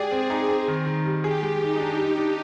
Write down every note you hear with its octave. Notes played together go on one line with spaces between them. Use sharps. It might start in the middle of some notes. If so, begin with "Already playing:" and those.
Already playing: G#3 G4 G#4 D5
C4
D#4
C4
D#3
D#3
G3
G4 G#4
G#3
G#3 D#4
D4
G3
D4